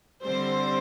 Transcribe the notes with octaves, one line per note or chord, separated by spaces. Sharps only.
D3 G3 C4 C5